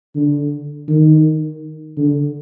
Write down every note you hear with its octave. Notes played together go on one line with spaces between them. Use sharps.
D3
D#3
D3